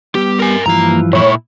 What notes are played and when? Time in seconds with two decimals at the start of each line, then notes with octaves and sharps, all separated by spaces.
0.15 G3 B3 G4
0.39 A#4 G#5
0.66 G2 E3 F3 A#3 A#5
1.13 A#2 E4 C#5